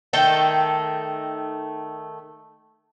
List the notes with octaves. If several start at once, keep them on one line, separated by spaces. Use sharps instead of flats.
D#3 A3 A4 G5